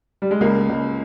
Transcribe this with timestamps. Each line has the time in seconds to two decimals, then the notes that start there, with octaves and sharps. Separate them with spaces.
0.22 G3
0.31 G#3
0.41 C#2 A#3
0.69 C#2